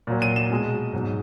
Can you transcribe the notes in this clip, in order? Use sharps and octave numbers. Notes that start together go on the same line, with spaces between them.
A#2 F#3
D#7
E7
B2 G#3
G#2 F#3